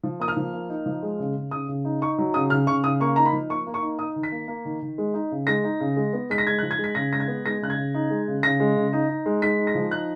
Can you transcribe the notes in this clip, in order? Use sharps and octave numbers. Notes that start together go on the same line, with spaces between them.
F3
A#3 D#6
F6
F3
A#3
D#4
F3
G#3
C#3
C#3
C#3 D#6
C#3
D#4
D#4 C#6
F#3
C#3 D#6
C#3 F6
C#3 C#6
C#3 D#6
A#3 C#6
D#4 A#5
B5
F3
A#3 C#6
A#3
C#6
D#4
D#4 D#6
D#3
B6
A#3
A#3
D#3
D#3
G#3
D#4
C#3
G#3 A#6
D#4
C#3
G#3
B3
G#3 B6
A#6
G#3 G#6
F#6
F3
G#6
G#3
B6
C#3 A#6
G#3 A#6
G#6
B3
G#3 A#6
C#3 F#6
G#6
C#3
D#4
G#3
C#3
C#3 A#6
G#3
C#3
D#4
D#4
G#3
G#3 B6
D#4
A#6
F3
D#4 F#6